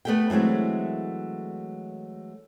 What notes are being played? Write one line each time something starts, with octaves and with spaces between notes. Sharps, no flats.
A3 B3 C#4 G4 A4 G5
E3 F#3 G#3 A3 C4